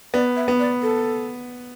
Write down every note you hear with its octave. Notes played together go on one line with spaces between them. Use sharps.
B3 D5
E5
B3
D5
A4